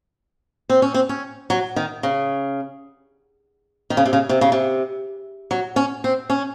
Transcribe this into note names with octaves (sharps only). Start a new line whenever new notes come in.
C4
C#4
C4
C#4
F#3
D#3
C#3
D#3
C#3
C3
C#3
C3
C#3
C3
F#3
C#4
C4
C#4